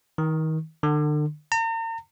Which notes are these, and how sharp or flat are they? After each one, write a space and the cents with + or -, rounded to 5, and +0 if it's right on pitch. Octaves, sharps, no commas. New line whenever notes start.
D#3 +30
D3 +35
A#5 -40